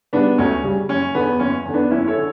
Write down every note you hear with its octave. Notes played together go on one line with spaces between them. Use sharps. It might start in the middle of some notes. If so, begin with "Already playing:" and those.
C#3 G3 B3 D4
D2 C#4
C#3 G3
F#1 C#4
E2 D3 B3
F#1 C#4
E2 D3
B3 D4
F#1 C#4 E4
A4 C#5
D3